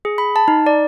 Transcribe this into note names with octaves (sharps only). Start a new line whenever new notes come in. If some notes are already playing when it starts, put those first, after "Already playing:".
G#4
B5
A5
D#4
D5